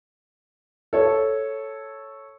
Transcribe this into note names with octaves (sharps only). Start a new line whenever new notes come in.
A4 C#5